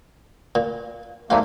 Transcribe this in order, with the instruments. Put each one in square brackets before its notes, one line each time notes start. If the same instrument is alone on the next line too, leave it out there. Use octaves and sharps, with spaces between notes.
[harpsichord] A#2
[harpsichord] G#2 G3 F4 [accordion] F#3 A3 A#3